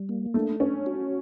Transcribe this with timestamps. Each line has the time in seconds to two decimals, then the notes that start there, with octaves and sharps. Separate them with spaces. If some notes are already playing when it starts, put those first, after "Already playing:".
Already playing: G3
0.09 A#3
0.34 A3 D4
0.60 C#4 D4
0.86 F#4